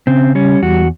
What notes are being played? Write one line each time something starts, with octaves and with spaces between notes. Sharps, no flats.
C#3 C4
G3 C#4
E2 F#4